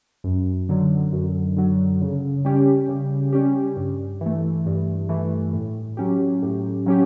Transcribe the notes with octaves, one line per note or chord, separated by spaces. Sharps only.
F#2
D3 F#3
F#2
D3 F#3
C#3
G3 C#4 G4
C#3
G3 C#4 G4
G2
E3 A3
G2
E3 A3
A2
F#3 C#4 G4
A2
F#3 C#4 G4